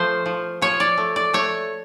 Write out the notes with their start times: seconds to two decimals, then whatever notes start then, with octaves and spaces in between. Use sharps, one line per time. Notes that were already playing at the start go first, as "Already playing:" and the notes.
Already playing: F3 A3 C5
0.26 F3
0.62 F3 C#5
0.80 D5
0.98 A3
1.16 D5
1.34 A3 C#5